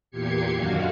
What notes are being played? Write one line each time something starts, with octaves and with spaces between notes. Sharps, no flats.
E2 A#2 G4 G#6 C7 C#7
F#2 D3 D#3 F#4 F5